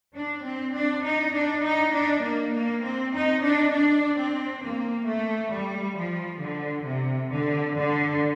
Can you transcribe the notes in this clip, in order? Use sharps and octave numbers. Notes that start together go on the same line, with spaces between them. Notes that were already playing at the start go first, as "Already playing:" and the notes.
D4
C4
D4
D#4
D4
D#4
D4
A#3
A#3
C4
D#4
D4
D4
C4
A#3
A3
G3
F3
D3
C3
D3
D3